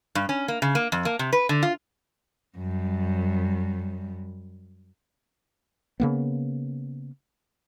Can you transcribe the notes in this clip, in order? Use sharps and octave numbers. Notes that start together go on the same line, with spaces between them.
G2
C#4
A#3
C#3
A#3
F2
A#3
C3
B4
D3
F4
F#2 G3
C#3 A#3 B3